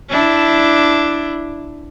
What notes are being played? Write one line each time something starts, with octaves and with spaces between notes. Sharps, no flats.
D4 E4